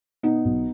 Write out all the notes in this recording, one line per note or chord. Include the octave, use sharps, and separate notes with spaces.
B2 B3 D#4
B1